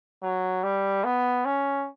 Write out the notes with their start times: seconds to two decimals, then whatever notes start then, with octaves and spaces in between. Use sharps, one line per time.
0.23 F#3
0.63 G3
1.04 B3
1.45 C#4